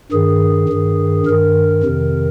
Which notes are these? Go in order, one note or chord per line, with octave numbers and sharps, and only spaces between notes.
G2 D#3 G#4
G2 D#3
G2 D#3 A#4
F2 C3 D#3